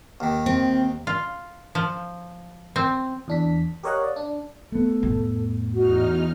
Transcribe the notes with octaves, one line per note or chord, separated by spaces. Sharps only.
D#2 D#3
C4
F4
F3
C4
E2 D4 B6
G4 A#4 C#5 D#5 F5 F#5
D5
D4
A3 B3 A4
F2 A2
E2 D#4 F#4 F6